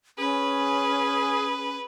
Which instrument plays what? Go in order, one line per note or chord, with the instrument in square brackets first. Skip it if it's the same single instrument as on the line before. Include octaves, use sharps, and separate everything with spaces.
[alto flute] C#4 [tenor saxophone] G#4 [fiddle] B4